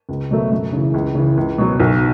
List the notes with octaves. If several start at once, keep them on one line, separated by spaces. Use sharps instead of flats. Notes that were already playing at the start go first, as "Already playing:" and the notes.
C#2
B2 F#3 A3
F#2
C#3 E3
C#2
C#3 E3
C#2
B2 F#3
B1